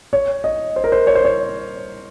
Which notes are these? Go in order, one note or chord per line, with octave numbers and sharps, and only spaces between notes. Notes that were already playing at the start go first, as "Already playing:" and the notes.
C#5
D#5
C5
A#4
C5
C#5
C5
C#5